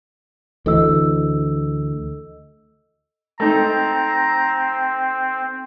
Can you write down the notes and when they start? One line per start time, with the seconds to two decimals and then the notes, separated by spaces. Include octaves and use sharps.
0.66 D2 E3 A4 D#5 E6
3.40 A3 C4 D#4 A#5